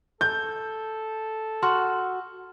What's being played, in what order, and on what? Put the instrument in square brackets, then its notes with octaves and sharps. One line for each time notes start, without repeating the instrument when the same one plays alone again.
[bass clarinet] A4 [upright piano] G6
[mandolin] F#4 [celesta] C6 F6